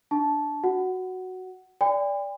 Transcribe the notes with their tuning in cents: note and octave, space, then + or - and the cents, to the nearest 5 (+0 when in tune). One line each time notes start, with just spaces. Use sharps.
D4 +0 A5 -15 C#6 +25
F#4 +0 F#5 +15
D5 -15 G5 +45 B5 +45